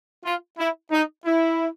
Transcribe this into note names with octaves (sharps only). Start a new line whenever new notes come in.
F4
E4
D#4
E4